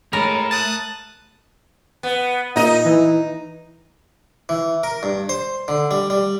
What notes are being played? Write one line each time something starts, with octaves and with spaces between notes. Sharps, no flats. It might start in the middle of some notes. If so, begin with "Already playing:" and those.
G#3 A3 A#4 C#5 B5
A5 D#6 F#6 A6
B3
A#2 D#4 D#5
E3
E3
A#4
G2
C5
D3
G3
G3